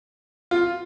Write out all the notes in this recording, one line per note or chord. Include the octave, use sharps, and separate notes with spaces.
F4